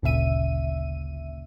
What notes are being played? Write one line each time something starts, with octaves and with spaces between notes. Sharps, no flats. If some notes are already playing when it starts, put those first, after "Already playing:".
G1 D2 A#2 C#3 E5 D#7